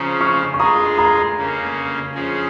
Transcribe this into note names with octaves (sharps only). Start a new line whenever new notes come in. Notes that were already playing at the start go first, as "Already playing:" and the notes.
Already playing: C#3 F3 C#4 A#5 D#6
C#6 F6
C#6
G#3 F4 G#4 A#5 D#6
A#5 D#6
C#3 A#3 C#4
C#3 F3 C#4 G#4